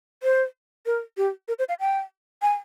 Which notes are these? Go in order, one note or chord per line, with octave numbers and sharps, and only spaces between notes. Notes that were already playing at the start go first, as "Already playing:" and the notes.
C5
A#4
G4
A#4
C5
F5
G5
G#5